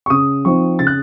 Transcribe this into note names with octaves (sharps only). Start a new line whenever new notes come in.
C#6
C#3 D#6
F3 C4 D#4 C#6
C#3 A6
F#6